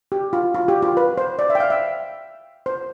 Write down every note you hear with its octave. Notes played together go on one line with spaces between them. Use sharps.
G4
F4
F4
G4
F4
B4
C5
D5
E5
G5
F5
E5
C5